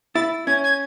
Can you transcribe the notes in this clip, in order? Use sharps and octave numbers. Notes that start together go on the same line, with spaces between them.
E4 A6
C#4 G#6
G#6